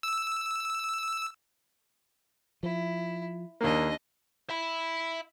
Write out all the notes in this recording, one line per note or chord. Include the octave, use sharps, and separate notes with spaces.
E6
F3 E4
D#2 A#3 D4 D#5
E5 B5